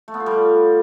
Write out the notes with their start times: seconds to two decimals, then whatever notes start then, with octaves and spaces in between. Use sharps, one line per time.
0.08 A3
0.14 B3
0.20 F4
0.26 G3